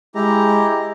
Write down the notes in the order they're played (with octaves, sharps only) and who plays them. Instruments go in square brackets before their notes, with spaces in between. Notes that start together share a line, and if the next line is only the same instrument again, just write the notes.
[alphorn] G#3 [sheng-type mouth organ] E4 G4 A#5